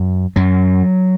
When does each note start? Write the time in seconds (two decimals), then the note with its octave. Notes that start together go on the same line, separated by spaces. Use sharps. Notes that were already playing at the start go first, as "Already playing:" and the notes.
Already playing: F#2
0.36 F#2 F#3